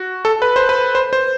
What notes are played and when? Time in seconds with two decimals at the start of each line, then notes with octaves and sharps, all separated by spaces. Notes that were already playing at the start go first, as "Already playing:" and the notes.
Already playing: F#4
0.25 A4
0.42 B4
0.56 C5
0.69 B4
0.95 C5
1.13 C5